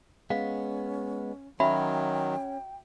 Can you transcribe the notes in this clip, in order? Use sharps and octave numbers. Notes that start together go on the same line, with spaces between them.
G#3 B3 C#4 F5
D#3 F#3 C#4 F#4 E5 G5 B5